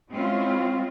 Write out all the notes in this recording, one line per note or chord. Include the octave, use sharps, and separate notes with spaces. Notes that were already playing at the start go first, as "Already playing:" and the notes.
G#3 C4 C#4 E4 F4